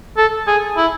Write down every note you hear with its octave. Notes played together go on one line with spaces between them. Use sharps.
A4
G#4
E4